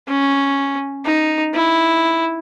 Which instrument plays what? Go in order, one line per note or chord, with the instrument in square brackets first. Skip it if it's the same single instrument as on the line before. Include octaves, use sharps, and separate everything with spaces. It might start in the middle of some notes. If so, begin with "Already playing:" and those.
[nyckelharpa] C#4
D#4
E4